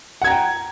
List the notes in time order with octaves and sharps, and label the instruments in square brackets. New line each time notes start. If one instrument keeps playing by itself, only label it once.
[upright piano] F#5
G#6
A#5
G5